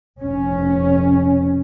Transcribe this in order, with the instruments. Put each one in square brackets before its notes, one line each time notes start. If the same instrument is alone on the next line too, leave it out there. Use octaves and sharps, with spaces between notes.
[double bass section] F1 C#4